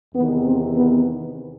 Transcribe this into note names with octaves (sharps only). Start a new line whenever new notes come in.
E2 C3 D#3 B3
C4
B3